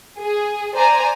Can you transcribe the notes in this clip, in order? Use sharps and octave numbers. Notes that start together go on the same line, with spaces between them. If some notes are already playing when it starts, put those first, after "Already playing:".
G#4
C5 D5 G#5 A#5